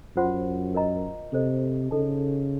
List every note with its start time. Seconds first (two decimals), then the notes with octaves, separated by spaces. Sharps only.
0.16 F#2 F4 C5 F#5 C6
0.74 A#4 D#5 A#5
1.32 C3 A4 C5 D#5
1.91 C#3 D#4 A4 D#5 A5